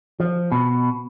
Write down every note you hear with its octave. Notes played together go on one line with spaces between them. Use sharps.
F3
B2